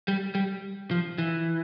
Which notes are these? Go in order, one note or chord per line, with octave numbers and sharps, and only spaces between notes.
G3
G3
F3
E3